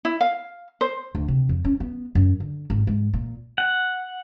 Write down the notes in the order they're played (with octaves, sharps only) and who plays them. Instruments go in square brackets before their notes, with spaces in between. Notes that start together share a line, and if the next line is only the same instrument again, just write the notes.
[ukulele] E4
F5
C5
[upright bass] D2
C3
F2
C#4
B3
F#2
D3
G#1
G#2
A#2
[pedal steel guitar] F#5